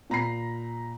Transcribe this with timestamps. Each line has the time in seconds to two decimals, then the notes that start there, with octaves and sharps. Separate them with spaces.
0.10 A#2 A#5 B5 C7